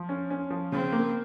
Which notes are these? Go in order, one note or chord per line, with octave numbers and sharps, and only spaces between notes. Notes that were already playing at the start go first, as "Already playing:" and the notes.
Already playing: F3
C#4
C#4
F3
C#3 C4
A#3